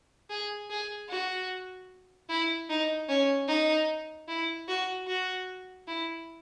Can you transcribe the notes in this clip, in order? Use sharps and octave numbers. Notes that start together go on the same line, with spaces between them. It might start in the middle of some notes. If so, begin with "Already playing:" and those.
G#4
G#4
F#4
E4
D#4
C#4
D#4
E4
F#4
F#4
E4